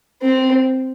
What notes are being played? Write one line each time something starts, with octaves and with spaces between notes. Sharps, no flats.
C4